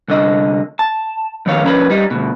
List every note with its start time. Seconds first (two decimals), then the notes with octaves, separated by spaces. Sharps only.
0.08 C2 D3 D#5
0.79 A5
1.46 F2 D#3 C#5 F5
1.63 F2 C#4 A#4 B4
1.90 G3 D#4
2.11 D2 B2